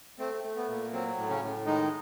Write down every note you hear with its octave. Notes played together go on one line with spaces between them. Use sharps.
A3 C4
A3
B3
A#2
F#3 C4
A2
C#3 C#4
A2
D#3 G#3 D#4